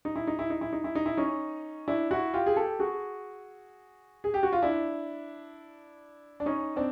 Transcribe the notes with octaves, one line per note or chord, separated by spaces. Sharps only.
D#4
E4
D#4
E4
D#4
E4
D#4
E4
D#4
E4
C#4 D#4
D4 E4
E4 F#4
F4 G4
G#4
G4 A4
F#4 G#4
G#4
G4
F#4
F4
D4 E4
D4
C#4 D#4
C4 D4